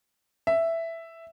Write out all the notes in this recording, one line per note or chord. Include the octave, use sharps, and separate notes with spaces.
E5